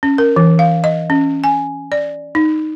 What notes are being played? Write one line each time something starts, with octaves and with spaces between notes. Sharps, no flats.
C#4
A#4
E3
F5
D#5
C#4
G#5
D5
D#4